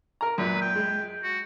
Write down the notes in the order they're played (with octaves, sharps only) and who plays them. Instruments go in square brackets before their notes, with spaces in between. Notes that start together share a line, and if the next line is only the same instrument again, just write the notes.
[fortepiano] A#4 A#5
[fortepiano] F#2 A#2 [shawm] B4
[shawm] G5
[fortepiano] G#3
[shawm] F#4